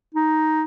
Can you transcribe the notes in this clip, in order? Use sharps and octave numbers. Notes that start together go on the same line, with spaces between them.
D#4